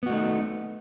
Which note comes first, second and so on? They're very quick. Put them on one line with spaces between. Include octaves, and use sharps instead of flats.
B3 F#4 A3 D#4